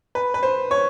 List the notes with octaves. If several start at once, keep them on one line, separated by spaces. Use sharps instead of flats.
B4
B4
C5
C#5